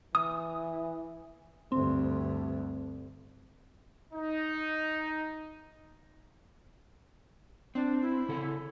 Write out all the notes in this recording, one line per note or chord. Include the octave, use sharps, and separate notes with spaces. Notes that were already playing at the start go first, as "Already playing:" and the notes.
E3 D#6
D2 G2 C4
D#4
C4 D4
E4
C#3 A4